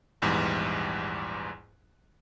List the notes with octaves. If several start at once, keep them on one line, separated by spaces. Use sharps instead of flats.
A#1 E2 G#2 E3 G3